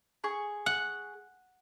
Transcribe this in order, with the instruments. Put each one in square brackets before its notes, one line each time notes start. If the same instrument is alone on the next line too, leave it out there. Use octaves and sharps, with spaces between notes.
[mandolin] G#4 C#6
[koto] F#5